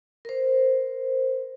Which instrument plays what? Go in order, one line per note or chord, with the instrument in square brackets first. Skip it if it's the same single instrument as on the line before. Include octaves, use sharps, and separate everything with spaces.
[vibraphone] A#4 C5